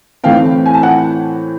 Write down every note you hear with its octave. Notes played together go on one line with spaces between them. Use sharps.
A2 E3 A3 C4 F5 G5
G#5
A5
F#5 G#5